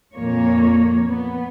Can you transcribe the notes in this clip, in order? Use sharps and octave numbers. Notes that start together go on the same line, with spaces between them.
F2 A#2 A#3 C#5
B3